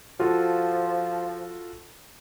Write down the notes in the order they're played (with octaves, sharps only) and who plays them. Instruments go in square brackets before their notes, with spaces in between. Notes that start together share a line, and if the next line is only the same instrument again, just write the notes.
[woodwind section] F3 [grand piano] F4 F#4 A4